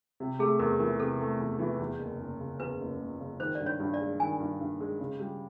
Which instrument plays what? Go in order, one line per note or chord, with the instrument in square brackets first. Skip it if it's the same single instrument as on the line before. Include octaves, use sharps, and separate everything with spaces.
[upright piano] C3
[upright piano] A3 [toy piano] G#4
[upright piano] E2 [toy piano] A#4
[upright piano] E3 [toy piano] A#4
[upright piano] C3 [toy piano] A4
[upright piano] A3
E2
E3
E2
F#1
F#1
C#3
[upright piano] E2 [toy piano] B4
[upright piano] F#1
F#1
C#3
[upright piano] D#3 [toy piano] C5
[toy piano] D5
[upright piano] G2
[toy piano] C#5
[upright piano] G2
[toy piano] D5
[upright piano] G#3
[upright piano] D#3 [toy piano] G#5
[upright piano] G2
G2
G#3
C#3
G3